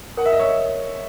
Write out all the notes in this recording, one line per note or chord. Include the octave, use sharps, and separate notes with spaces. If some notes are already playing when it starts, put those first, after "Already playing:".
A#4 F#5
E5
D#5
C#5 E5